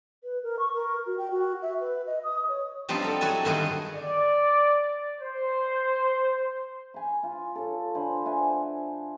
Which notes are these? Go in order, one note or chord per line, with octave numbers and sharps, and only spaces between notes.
B4
A#4
C#6
A#4
F#4
G5
F#4
E5
B4
D#5
D#6
C#5
F3 G3 B3 C4 D4 D#4
A4 A#5
F#3 E4 F#4 A4 G#5
G2 D3 D#3 B3 G#4 D#5
D5
C5
G#5 B5
F4
A4 C#5
D3 C5 G#5 B5
C5 E5 F#5 G#5